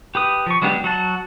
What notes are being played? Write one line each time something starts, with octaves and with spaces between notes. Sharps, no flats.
G4 B4 D#6
F3 C#6
F#3 G#3 B3 D4 G4
F#3 F#4 A5